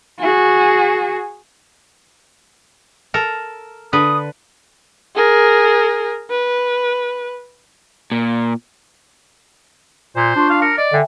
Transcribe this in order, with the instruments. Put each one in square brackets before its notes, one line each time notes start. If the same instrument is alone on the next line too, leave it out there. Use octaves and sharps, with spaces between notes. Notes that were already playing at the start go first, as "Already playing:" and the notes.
[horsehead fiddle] F#4 G#4
[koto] A4 A#4
[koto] D3 B4 [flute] D#6
[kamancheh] G#4 A#4
B4
[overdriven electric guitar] A#2
[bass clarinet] A#2 [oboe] C5
[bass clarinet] D4 [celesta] F4 C6 C#6
[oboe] F5
[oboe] A#4 [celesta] C#7
[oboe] D5 [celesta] D#5
[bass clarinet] D3 [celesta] E5 G5 G#5